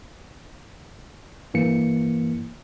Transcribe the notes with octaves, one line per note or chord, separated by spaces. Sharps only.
G2 E3 A#3 C#7